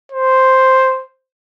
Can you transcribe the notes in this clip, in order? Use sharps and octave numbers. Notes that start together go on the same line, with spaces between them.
C5